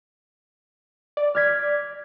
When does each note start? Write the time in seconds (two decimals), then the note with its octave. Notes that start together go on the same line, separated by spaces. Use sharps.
1.17 D5
1.35 F6 G#6 B6